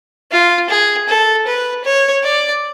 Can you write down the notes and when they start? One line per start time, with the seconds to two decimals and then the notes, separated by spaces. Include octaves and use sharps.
0.32 F4
0.69 G#4
1.08 A4
1.47 B4
1.84 C#5
2.23 D5